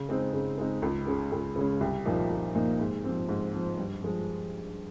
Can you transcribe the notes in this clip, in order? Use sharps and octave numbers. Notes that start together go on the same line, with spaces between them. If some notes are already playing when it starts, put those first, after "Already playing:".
Already playing: C#3
G#3 C4 D#4
C#3
G#3 C4 D#4
C#2
C#3 G#3 C#4
C#2
C#3 G#3 C#4
C2
A#2 F3 A#3 D#4
C2
A#2 F3 A#3 D#4
G#2
F3 C4
G#2
F3 C4
G2
F3 G#3